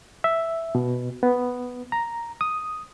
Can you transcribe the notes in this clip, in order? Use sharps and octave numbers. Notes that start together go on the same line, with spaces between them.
E5
B2
B3
A#5
D#6